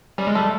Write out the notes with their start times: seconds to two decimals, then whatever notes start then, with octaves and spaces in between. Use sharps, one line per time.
0.18 G3 C#4
0.27 G#3
0.35 G3 A3